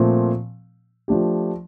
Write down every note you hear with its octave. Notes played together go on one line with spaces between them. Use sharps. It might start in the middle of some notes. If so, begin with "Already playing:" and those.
Already playing: A#2 F3 A3 C4
F3 A3 D4 G4